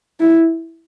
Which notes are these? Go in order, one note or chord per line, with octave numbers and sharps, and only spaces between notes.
E4